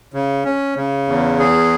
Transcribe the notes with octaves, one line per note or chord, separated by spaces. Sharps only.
C#3
C#4
C#3
E2
G#4